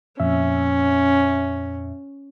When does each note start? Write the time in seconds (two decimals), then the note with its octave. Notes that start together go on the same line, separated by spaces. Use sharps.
0.20 F2 A#2 C#4 E5